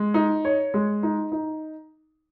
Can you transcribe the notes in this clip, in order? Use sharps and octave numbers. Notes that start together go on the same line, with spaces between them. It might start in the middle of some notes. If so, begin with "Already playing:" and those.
Already playing: G#3
D#4
C#5
G#3
D#4
D#4